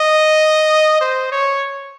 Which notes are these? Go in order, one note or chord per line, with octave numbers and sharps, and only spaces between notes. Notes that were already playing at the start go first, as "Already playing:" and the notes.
Already playing: D#5
C5
C#5